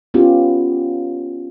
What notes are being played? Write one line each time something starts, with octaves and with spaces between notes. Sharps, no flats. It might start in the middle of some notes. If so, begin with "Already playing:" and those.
B3 C#4 F4 G4